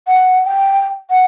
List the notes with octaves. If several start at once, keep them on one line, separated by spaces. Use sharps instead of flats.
F#5
G5
F#5